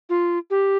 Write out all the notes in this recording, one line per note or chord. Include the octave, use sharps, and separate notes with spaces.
F4
G4